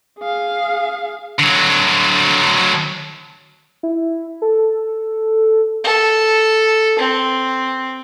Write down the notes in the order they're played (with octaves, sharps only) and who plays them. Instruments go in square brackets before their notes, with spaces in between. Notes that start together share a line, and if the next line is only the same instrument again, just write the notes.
[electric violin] G#4 F5
[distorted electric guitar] D3 F#3
[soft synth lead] E4
A4
[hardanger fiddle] A4
C4